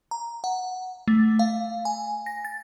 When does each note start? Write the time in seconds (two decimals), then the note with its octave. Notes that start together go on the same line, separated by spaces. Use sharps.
0.11 A#5
0.44 F#5
1.08 A3
1.39 F5
1.85 G#5
2.26 A#6
2.45 A6